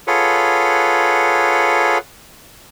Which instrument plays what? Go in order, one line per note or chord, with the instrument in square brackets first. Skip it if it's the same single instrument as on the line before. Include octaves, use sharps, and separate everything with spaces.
[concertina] F4 G#4 A4 B4 C#5 F#5